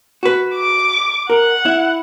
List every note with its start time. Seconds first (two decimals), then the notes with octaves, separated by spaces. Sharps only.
0.23 F#4 B4
0.54 D6
1.30 A#4 F#5
1.65 E4